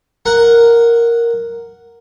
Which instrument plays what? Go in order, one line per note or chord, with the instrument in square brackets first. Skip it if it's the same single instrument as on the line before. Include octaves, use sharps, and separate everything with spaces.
[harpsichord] A#4 F#5